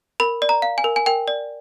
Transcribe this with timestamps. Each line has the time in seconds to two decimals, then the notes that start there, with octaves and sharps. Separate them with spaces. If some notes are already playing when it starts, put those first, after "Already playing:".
0.20 A#4 B5
0.42 D5
0.49 A#5
0.62 F5
0.78 G#5
0.84 A#4
0.96 G#5
1.06 A#4 G5
1.28 D5